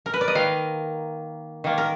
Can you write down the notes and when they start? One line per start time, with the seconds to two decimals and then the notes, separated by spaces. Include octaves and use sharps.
0.06 A#4
0.13 B4
0.21 D5
0.28 D#5
0.35 D#3 A#3 F5
1.64 D#3 A#3
1.78 A#4